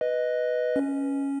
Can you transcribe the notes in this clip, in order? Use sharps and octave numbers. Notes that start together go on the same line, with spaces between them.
B4 D#5
C#4